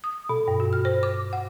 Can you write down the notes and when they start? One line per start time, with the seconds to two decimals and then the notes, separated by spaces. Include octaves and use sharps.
0.04 D#6
0.29 B2
0.48 G2
0.60 F#4
0.73 F6
0.85 C5
1.03 D6
1.33 F#5